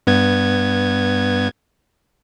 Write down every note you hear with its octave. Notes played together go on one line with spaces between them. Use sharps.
G2 B3 G#6